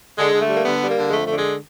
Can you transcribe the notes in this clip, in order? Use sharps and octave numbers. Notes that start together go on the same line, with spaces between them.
D3 G#3
D3
A3
G3
A#3
D3 B3
G3
A#3
D3
G#3
F2 A3
D3 A3
G#3